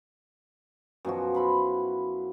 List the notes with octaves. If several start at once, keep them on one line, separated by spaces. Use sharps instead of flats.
F#2 B2 F3 F#4
E4 B5 C6